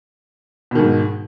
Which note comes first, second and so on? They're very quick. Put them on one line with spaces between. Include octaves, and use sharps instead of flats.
B2 D#3 G#2